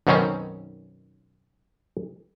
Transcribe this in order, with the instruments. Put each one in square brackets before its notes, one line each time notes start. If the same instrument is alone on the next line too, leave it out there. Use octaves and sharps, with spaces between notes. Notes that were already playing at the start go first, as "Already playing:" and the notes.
[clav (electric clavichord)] B1 F#2 B2 D#3 C4 C#4